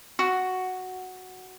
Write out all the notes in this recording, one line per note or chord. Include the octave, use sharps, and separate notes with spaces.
F#4